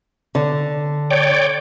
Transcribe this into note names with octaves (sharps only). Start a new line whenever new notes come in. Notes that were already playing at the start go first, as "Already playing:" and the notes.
D3
C#5 D5 G5